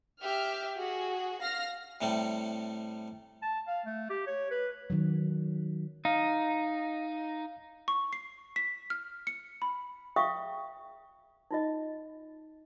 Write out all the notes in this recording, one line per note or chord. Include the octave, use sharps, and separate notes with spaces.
G4 E5 F6
F#4 G#4
F5 F6 A#6
A2 C3 G3 A3
A5
F5
A3
G4
C#5
B4
D#3 F#3
D#4 F5
C#6
C7
B6
F6
C#7
B5
G#4 E5 F5 G5 C#6 D#6
D#4 F4 D#5